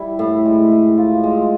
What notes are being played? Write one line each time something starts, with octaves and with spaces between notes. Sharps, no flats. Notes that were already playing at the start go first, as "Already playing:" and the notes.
Already playing: G3 E4
A2
G#3
A3
F4
G#3